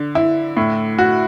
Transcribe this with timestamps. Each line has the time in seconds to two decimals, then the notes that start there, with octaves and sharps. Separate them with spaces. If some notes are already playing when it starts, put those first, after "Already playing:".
Already playing: D3
0.15 E4
0.57 A2
0.98 F#4